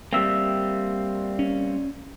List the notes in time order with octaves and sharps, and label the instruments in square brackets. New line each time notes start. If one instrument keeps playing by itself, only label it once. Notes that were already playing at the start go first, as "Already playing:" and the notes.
[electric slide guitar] G3 C4 [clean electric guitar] A#3 E5
[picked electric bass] C#4